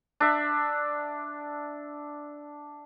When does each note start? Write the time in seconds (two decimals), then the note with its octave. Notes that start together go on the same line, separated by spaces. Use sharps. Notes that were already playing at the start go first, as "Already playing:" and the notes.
0.20 D4 E5